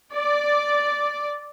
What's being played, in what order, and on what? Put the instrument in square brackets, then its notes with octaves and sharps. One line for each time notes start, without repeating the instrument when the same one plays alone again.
[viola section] D5